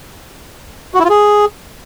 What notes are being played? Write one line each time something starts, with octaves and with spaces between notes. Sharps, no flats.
F#4
E4
F4
G#4